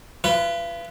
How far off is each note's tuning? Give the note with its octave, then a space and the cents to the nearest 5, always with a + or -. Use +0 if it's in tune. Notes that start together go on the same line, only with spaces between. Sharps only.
F4 -40 B4 +0